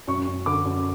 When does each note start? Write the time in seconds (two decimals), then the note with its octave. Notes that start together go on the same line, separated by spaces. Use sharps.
0.07 F#2 C#6
0.27 F#2
0.46 D3 D6
0.65 F#2